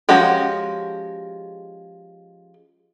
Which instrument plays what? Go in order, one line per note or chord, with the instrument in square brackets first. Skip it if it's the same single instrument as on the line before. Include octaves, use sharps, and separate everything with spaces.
[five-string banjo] F3 G#3 C#4 F#4 G4